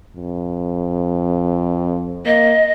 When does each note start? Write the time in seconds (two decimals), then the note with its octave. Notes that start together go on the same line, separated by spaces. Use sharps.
0.16 F2
2.26 A#3 D#5